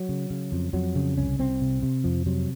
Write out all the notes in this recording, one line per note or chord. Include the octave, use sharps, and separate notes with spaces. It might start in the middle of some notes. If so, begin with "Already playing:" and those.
Already playing: F#3
C#3
C#3
F2
F2 F#3
C#3
C2 C#4
C2 C4
C3
C3
F2 F3
C3 F#3